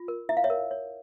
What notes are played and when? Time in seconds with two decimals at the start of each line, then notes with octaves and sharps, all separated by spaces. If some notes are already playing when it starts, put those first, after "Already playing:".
Already playing: F4
0.08 A#4
0.29 E4 E5
0.37 F5
0.44 C#5 E5
0.50 A#4
0.71 C#5